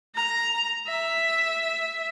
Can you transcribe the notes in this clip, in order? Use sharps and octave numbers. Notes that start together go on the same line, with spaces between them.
A#5
E5